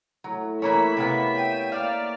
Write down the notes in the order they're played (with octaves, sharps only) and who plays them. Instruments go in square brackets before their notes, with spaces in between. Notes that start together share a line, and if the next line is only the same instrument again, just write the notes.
[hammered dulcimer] A2 [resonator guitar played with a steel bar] F#3
[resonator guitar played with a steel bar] E3 A#3 C#5 [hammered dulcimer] C#4 [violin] E5 [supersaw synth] B5 B6
[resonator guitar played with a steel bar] C3 A#3 B3
[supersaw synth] G5 D#7
[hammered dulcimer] A#3 [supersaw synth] D5 D6 F6 [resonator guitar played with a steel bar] F5